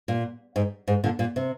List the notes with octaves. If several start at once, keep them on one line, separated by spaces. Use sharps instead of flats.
A#2
G#2
G#2
A#2 D3
A#2
C3